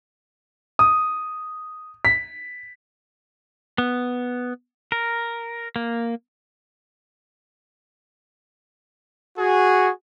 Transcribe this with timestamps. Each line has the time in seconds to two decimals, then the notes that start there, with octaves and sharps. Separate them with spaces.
0.79 D#6
2.05 B6
3.78 B3
4.92 A#4
5.76 A#3
9.38 F#4 G#4